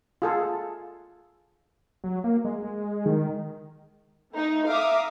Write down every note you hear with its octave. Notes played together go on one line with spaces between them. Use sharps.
F4 G#4 A4
F#3
A#3
G#3
G#3
D#3
A3 D#4
E5 F5 A#5 D6 D#6